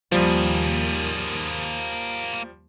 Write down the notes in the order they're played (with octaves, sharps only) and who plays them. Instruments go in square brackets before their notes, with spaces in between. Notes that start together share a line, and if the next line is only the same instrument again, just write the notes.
[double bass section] D#2 [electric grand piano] F3 G3 [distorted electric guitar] A#3 G#4